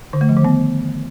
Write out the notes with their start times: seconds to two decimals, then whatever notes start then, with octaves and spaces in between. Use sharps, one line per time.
0.13 D3
0.21 A3
0.29 F3
0.37 D#3
0.44 B3